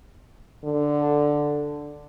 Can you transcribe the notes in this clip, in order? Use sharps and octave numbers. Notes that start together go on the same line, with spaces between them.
D3